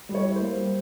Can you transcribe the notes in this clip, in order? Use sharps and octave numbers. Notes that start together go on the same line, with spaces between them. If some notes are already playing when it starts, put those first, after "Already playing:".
G3
C#5
E4
A#3 C5
G3